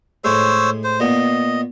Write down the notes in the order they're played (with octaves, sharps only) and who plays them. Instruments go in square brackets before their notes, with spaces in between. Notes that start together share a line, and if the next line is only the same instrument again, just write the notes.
[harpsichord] A2 G#3 [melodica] C5 C#5 E6
[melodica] C5
[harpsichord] A#2 B3 [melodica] D#5